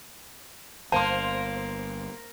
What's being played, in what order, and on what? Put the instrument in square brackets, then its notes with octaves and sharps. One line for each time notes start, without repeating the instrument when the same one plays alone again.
[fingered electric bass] G1 [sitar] A#3 [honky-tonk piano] C5 C6 [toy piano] A5